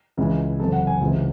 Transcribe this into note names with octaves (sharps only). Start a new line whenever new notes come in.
C#2 C#3 E3 G#3
F#1 E2 C3 A4
F#5
G#5
C#2 C3 E3 G#3